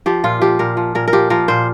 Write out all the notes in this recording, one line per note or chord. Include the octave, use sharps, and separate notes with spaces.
F3 G4
A#2 F4
F3 G4
A#2 A#4
F3
A#2 A#4
A#4
F3 G4
F3 A#4
A#2 C5